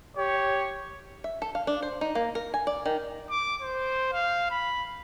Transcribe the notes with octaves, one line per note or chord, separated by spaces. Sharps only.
G4 C#5
E5
A4
F5
D4
C5
D#4
A#3
A#4
G#5
D5
D#3
D6
C5
F5
B5